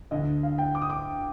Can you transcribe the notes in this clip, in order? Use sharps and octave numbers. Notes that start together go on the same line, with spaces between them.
D2 D3 D#5
F5
G5
D6
D#6
D6